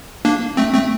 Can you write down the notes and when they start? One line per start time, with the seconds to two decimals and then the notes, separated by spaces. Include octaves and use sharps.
0.25 A#3 D4
0.57 A3 C4
0.74 A3 C4